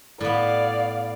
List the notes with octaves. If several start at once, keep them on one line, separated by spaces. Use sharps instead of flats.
A2 B3 D5 F5